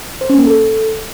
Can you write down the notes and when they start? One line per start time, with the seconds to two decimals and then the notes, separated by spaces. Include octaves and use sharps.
0.21 C5
0.30 C#4
0.38 A#3
0.47 A4